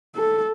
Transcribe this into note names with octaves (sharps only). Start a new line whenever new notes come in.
A4